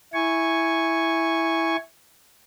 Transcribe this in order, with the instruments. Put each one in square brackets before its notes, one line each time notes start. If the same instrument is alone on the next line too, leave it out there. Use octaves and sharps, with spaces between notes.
[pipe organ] E4 G#5 C#6